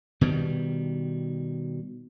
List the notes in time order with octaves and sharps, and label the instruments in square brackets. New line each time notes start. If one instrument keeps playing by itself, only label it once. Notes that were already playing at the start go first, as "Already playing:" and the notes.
[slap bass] B2 D#3 G3